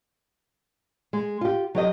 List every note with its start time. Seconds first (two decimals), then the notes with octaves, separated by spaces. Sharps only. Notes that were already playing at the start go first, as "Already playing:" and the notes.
1.13 G#3
1.41 F4 G4
1.75 F#3 G4 D#5